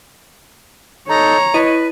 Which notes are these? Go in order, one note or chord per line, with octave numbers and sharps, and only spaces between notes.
D#4 A4 C#5 A#5
E4 B4 D#5 D#7